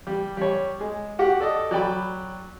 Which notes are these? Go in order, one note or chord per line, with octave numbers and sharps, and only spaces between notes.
G3
G3 C#5
G#3
F#4 G4 F#5
A4 D5 D#5
F#3 D5 G5 B5